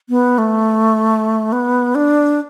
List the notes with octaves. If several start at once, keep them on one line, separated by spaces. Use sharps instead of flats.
B3
A3
B3
D4